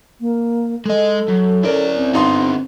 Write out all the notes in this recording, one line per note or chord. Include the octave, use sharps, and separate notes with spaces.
A#3
G#3 A4 D#5
F#2
C#4 E4 A#4 D5
C4
G2 D3 B3 D#4 C6